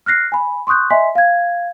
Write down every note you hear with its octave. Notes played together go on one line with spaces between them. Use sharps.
F6 F#6 A#6 C7
G#5 B5
C6 C#6 D#6 F#6 G6
D#5 E5 G#5 C6 B6
F5 G#6